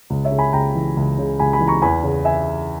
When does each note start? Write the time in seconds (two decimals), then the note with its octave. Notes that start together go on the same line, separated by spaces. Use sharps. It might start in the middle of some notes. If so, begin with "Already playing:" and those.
0.10 C#2
0.24 C#5 E5
0.31 C#3
0.38 G#5 B5
0.53 C#2 G5 A#5
0.75 E3
0.97 C#2
1.18 C#3
1.39 C#2 G#5 B5
1.53 G#5 B5
1.60 E3
1.67 A#5 C#6
1.82 E2 G#5 B5
2.03 C#3
2.25 E5 G#5